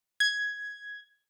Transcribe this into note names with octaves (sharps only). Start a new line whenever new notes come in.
G#6